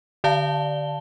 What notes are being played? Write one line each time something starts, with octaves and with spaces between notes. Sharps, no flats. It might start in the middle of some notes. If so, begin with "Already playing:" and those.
D3 D5 F5 A5 G7